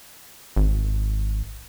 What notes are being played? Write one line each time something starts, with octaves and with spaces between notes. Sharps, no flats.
G#1